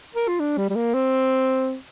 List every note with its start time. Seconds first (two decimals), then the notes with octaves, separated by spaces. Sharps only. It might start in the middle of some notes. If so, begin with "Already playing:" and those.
0.15 A#4
0.28 F4
0.40 D4
0.58 G3
0.70 G3
0.76 A#3
0.94 C4